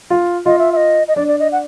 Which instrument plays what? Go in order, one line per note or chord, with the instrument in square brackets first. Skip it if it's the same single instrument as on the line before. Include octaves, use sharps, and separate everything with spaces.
[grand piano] F4
[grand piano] F4 [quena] D#5
[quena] E5
E5
D#5
D#5
[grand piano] D4 [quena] D5
[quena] D5
D#5
F#5